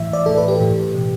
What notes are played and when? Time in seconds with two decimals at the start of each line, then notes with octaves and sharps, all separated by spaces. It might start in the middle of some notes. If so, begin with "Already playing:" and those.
Already playing: A2 E3 E5
0.13 D5
0.26 A2 E3 A4
0.38 B4
0.48 G4
0.60 A2 E3
0.94 B2